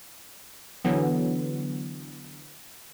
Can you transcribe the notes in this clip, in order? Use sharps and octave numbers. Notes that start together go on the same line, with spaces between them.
D3 E3 F#3 B3